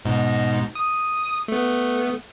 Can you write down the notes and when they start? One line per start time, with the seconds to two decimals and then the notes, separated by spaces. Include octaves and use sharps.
0.05 G#2 B2 D#4
0.75 D#6
1.48 A3 B3